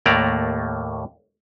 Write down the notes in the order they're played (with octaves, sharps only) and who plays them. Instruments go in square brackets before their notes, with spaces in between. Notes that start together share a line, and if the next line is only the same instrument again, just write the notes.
[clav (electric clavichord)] D#2 A2 A3 A#3 D5 A#5